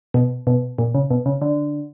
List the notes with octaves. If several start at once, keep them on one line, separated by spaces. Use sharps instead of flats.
B2
B2
A#2
C#3
B2
C#3
D3